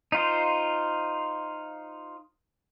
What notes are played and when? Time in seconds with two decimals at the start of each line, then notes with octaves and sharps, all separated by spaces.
0.12 D#4 F4 C5